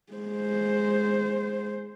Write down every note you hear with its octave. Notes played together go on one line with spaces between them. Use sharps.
G#3 C5